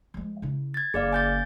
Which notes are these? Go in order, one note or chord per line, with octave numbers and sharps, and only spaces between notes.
F3 G#3
C#3 E4
G#6 A6
F#1 G#4 D5 F5
G#5 G6 A6